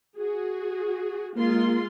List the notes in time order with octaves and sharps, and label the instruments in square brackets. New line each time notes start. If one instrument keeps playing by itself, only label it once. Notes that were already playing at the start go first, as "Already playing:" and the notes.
[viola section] F#4 G#4
[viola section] G#3 F4 C6 [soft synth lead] A#3